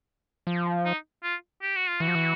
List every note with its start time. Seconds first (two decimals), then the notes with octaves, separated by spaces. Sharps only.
0.47 F3
0.85 D#4
1.23 F4
1.62 G4
1.76 F#4
1.88 F4
2.00 E3 F#4
2.08 F3
2.15 E3